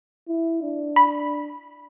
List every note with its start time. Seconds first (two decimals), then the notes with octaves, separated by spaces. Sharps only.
0.28 E4
0.62 D4
0.96 B5